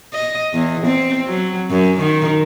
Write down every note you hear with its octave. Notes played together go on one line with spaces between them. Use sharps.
D#5
E2
C4
F#3
F#2
D#3